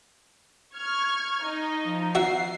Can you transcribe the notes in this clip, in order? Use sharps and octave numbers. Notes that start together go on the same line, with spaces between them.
C#6 F6 G#6
D#4
F3
F#4 E5 F#5 C7